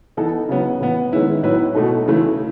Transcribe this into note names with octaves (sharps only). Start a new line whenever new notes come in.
E3 B3 D#4 A4
C#3 F#3 B3
A2 E3 B3
D#3 G#3 C#4 E4 B4
A2 F#3 B3 E4 B4
B2 A3 D#4 A4
C#3 E3 A3 E4